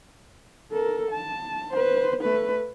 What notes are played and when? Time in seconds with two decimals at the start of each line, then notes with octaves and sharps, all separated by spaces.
0.72 A4 A#4
1.11 A5
1.72 B4 C5
2.21 A3 B4